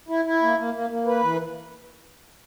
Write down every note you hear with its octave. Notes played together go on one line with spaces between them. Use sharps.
E4
E4
A#3
A#3
A#3
A#3
B4
E3